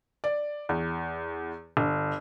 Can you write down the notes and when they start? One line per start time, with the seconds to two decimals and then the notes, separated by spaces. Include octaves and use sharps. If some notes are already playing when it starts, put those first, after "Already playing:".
0.24 D5
0.69 E2
1.77 G1